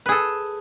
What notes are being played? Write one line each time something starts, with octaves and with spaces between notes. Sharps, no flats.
G#4 A4 B4